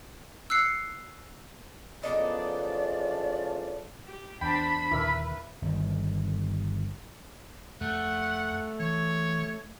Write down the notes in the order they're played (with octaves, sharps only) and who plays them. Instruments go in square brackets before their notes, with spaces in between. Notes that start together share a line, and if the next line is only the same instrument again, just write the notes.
[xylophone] E6 F#6 C7 C#7
[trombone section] A2 C#3 F3 [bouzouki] B3 D4 D#4 [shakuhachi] D5
[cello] G4
[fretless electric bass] E2 [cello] D4 C5 [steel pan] G5 A5 [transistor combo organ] B5
[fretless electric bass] D#2 A#2 D3 [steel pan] E4 A#4 E5 [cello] B4
[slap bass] G1 D#3
[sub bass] F2 [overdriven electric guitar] A3 [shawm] F#5
[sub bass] E3 [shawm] C#5